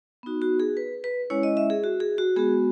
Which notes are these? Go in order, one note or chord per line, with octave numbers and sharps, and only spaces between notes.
B3 D#4 F#4
F#4
G#4
B4
B4
G#3 C#4 E4 C#5
D#5
E5
G#4
F#4
G#4
F#4
G#3 B3 F#4 G#4